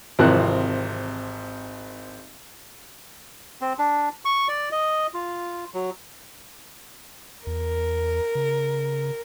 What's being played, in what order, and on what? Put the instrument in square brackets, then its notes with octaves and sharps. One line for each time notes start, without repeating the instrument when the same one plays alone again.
[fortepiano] G#1 C3 E3 F3 A#4 F#6
[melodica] C4
D4
C#6
D5
D#5
F4
F#3
[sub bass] E2 [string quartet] A#4
[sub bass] C#3